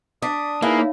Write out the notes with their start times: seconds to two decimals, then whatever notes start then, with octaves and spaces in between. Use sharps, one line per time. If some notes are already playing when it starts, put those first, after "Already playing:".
0.22 D4 D6 D#6 B6 C7
0.62 A#3 D#4 E4 G#4 B4 F#6
0.76 D#4 C#5 F5